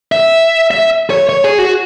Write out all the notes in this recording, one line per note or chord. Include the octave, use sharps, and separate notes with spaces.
E5
E5
C#5
C#5
G#4
F#4